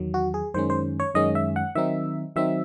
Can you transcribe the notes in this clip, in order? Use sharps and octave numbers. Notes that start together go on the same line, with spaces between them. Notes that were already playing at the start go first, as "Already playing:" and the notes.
Already playing: E2 D#3 F#3
F#4
G#4
F#2 D#3 G#3 C#4 C5
C5
C#5
F#2 D#3 G#3 C#4 D#5
E5
F#5
D#3 F#3 C4 D#4 E5
D#3 F#3 C4 D#4 E5